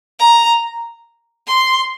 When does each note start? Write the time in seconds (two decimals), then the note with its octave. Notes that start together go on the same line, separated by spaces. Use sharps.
0.19 A#5
1.47 C6